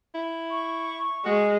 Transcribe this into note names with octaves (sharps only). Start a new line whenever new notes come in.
E4
C#6
G#3 F#4